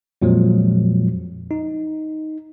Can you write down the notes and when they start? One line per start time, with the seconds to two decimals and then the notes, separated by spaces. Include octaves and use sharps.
0.22 F2 A#2 F3 F#3 G#3
1.51 D#4